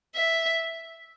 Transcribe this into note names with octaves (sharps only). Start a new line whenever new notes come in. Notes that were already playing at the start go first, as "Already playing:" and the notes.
E5